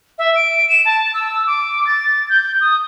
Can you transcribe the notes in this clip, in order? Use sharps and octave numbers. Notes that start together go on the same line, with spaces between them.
E5
D7
E7
A5
E6
D6
A6
G6
D#6